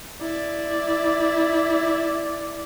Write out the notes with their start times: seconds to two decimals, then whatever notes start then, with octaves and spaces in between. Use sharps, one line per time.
0.22 E4 D5